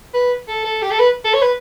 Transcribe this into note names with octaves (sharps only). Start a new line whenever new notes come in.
B4
A4
A4
G4
A4
B4
A4
C#5
B4